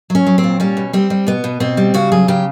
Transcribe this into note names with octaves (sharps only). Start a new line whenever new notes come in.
F#3 C#4
F#3
C4
A#2
G3 C#4
B2
G3 C4
G3
B2 B3
B2
B2 C4
G3
C#3 F#4
F#3 G#4
C#3 G4